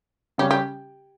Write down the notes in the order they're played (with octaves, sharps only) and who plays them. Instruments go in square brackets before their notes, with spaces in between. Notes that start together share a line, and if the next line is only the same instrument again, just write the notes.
[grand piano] C#3 G3 C#4 [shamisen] G4
[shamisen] G4